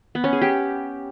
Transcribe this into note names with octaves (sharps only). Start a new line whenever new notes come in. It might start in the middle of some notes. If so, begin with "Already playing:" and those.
B3
C#4
G#4
G4